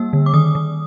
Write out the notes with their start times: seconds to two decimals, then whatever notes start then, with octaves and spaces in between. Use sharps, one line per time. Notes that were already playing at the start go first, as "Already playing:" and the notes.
Already playing: G3 A#3 E6
0.13 D3
0.26 D6
0.34 D#3 D#6
0.55 D#3